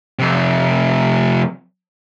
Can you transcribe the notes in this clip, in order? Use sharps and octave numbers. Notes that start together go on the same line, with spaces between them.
F2 C3